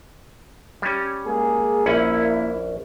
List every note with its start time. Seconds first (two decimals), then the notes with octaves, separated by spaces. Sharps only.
0.82 G3 C#4
1.26 G#3 A#3 G#4
1.86 A#1 A#3 C#4 E4 F#5